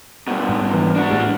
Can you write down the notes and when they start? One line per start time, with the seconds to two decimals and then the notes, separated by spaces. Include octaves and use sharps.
0.28 G2 B2 F#5
0.49 G#2
0.73 E3
0.96 D4 F#4
1.09 A2 G3 G#3